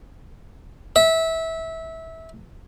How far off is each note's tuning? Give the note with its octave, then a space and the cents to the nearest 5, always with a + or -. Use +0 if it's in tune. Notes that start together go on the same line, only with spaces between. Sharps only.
E5 -20